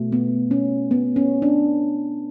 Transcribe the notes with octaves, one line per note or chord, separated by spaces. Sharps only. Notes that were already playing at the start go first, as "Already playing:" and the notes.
Already playing: B2 A3
B3
C#4
B3
C#4
D4